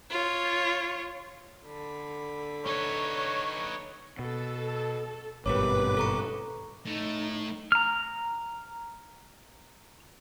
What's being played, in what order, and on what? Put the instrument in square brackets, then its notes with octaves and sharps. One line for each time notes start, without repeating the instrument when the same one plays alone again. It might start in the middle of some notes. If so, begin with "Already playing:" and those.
[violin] F4 C#5
[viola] D3 B5
[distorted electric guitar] D#4 B4 [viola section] C#5
[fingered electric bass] B2 [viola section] A4
[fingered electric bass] G#1 G2 B2 [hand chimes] G4 A#4 C#5 [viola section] B4 [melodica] D6
[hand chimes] A4 A#5 C#6
[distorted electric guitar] A2 [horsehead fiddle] D#4
[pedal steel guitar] A#5 F6